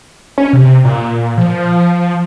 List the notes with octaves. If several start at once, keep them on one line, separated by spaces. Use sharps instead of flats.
C#4
C3
A#2
F3